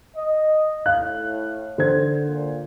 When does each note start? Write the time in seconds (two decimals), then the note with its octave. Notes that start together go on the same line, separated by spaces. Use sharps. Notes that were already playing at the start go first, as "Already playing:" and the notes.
0.16 D#5
0.86 A2 F5 F#6
1.78 D3 C5 G#6
2.27 A#2